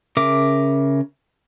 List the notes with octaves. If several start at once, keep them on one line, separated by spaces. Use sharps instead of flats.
C#3 A#4 E5 D6